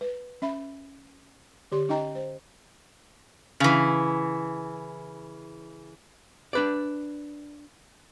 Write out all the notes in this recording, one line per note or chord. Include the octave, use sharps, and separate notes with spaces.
B4
C#4 E5 B5
D3 G4 D5 C6
C#4 D#4 D#5 G5 A#5
C5
C#3 E3
D4 B4 D5